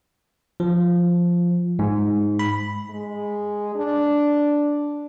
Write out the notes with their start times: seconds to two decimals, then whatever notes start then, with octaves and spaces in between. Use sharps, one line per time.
0.60 F3
1.79 G#2
2.39 B5
2.90 G#3
3.76 D4